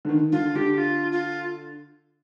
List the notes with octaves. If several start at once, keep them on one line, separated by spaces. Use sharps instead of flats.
D3
D#3
D3 F4
D3 G4
F4
F4